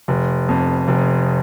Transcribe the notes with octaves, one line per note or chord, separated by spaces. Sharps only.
F1
F2
F1